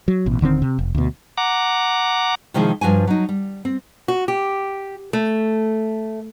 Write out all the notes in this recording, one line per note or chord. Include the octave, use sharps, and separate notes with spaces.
F#3
A1 B2
D#1 D3 D#3 C4
C3
F1
D2 B2
F#5 A#5 D6
C3 D#3 F3 G#3 E4 G#4
G2 F3 D4 F#4 G#5
F#3 D#4
G3
C4
F#4
G4
A3